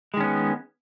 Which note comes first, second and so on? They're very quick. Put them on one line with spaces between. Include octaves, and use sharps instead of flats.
G#3 D#3 C#4 B3